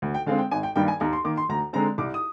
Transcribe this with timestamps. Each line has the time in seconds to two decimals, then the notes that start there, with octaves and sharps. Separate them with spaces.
0.02 D2
0.14 G5
0.26 D3 G#3 C4 F5
0.39 G5
0.51 G#1 G#5
0.63 G5
0.76 G2 D#3 G3 A#3 G5
0.88 G#5
1.00 D#2 A#5
1.13 C6
1.24 D#3 A#3 D6
1.37 C6
1.49 D2 A#5
1.73 D3 G#3 C4 A#5
1.98 C2 D6
2.14 D#6